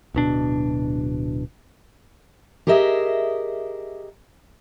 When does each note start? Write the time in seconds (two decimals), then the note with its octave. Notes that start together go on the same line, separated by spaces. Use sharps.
0.14 D1 B2 D4
2.67 G4 G#4 A#4 D#5 E5